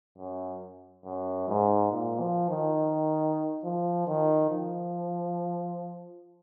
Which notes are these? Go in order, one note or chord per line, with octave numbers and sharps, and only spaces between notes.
F#2
F#2
G#2
A#2
F3
D#3
F3
D#3
F3